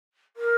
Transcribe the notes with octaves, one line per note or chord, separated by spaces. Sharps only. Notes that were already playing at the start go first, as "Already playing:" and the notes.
A#4